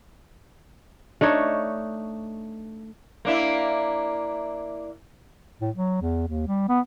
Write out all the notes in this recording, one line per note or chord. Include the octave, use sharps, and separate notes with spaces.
A3 D4 D#4 C#5
A#3 D4 E4
A2
F#3
E2
D#2
G3
B3